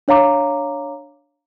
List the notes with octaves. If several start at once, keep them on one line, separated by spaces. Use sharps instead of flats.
D4 C#5 F5 A#5 D6